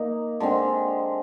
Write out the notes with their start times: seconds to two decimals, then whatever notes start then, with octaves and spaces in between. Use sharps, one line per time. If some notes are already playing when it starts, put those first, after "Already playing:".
Already playing: A#3 D#4
0.40 D3 G#3 C4